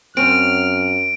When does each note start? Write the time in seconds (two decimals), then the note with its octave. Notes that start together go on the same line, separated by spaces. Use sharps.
0.17 F#2 C4 C#4 F6 D7